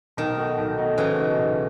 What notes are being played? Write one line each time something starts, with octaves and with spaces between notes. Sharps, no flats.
B1 D#3
B2 A3 D#4 F#4
B1
B2 A3 D#4 F#4
B1 C#3 E3
B2 A3 D#4 F#4
B1